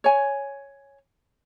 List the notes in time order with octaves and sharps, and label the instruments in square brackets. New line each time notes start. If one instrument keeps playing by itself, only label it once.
[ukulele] C#5 G#5